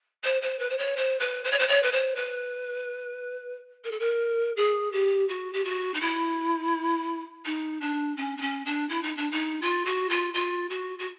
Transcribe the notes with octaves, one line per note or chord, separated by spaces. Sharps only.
C5
C5
B4
C5
C#5
C5
B4
C5
C#5
C5
C#5
B4
C5
B4
A#4
A4
A#4
G#4
G4
F#4
G4
F#4
D#4
E4
D#4
D4
C#4
D4
C#4
D4
E4
D#4
D4
D#4
F4
F#4
F4
F4
F#4
F#4